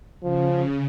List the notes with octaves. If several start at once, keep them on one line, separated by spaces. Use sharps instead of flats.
C#3 F3